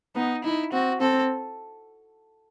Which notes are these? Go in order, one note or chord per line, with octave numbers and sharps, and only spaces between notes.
B3 D#4
D#4 E4
C4 F#4
C4 A4